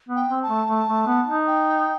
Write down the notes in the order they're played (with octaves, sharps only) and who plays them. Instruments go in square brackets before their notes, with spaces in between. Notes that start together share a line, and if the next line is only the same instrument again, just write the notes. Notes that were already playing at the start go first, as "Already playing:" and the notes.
[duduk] B3
[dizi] G5
[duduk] C4
[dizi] A5
[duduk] A3
A3
A3
B3
D#4
[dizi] G5